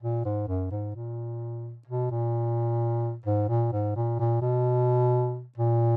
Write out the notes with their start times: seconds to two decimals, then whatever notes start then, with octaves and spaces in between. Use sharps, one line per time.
0.02 A#2
0.25 G#2
0.48 F#2
0.71 G#2
0.95 A#2
1.87 B2
2.11 A#2
3.26 G#2
3.49 A#2
3.73 G#2
3.96 A#2
4.19 A#2
4.42 B2
5.57 A#2